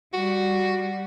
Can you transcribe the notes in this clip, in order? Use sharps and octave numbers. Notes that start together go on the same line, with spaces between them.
G3 F#4